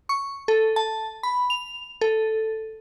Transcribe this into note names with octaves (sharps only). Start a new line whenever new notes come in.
C#6
A4
A5
B5
F7
A4